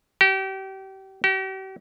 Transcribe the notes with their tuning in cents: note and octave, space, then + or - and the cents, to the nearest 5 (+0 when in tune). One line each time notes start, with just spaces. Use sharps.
G4 -35
G4 -45